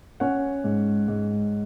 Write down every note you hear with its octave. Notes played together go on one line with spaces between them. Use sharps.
C#4 C#5 F#5
G#2
G#2